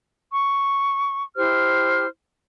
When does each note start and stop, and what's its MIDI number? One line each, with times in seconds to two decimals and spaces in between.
0.32 1.23 85
1.36 2.06 64
1.36 2.06 67
1.36 2.06 72
1.36 2.06 89